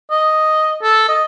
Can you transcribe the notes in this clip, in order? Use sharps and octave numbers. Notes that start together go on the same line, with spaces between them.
D#5
A4
D#5